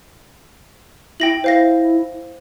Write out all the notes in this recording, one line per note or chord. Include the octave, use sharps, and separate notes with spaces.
E4 G5 A#6 F#7
C5 F5 A#6